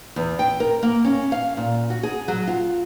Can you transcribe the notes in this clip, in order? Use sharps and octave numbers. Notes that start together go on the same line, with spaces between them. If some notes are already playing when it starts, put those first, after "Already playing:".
E2
G5
A#4
A#3
C#4
F5
A#2
F#4
G#4
F#3
F4